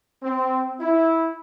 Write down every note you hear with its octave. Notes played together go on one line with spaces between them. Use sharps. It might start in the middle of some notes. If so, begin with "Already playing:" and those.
C4
E4